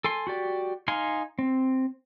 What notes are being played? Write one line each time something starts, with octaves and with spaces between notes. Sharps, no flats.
A4 G#5 C6
F#4 G4 D5
D#4 F5 G#5 C6
C4